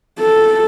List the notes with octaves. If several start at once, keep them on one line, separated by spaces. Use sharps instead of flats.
A4